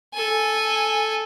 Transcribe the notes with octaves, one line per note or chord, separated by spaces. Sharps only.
A4 G#5